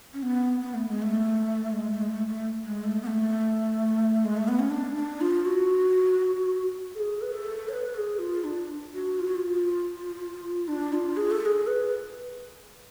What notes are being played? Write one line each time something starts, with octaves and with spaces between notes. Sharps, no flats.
C#4
B3
B3
A3
G#3
A3
G#3
A3
G#3
A3
A3
G#3
A3
B3
A3
G#3
A3
B3
C#4
D4
D4
F4
F#4
A4
G#4
B4
A4
C#5
B4
A4
G#4
F4
D4
F#4
F4
F#4
F4
D4
F4
G#4
A4
A4
G#4
B4